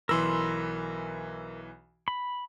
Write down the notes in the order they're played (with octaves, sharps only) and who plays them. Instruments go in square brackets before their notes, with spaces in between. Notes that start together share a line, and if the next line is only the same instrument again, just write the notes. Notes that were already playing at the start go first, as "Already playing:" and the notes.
[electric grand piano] B1 E3 E6 [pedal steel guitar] A#4 B5 C6
[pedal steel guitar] B5